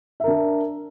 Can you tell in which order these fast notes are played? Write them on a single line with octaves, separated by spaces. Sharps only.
E5 A#4 D4